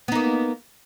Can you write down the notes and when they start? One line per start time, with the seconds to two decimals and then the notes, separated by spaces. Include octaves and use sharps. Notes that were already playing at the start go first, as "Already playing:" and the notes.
0.08 B3
0.12 D#4
0.15 A#3